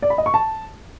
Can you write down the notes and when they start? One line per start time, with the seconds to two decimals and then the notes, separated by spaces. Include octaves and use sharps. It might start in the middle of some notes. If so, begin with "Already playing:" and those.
0.02 D5
0.10 B5
0.18 D#5
0.26 C#6
0.34 A5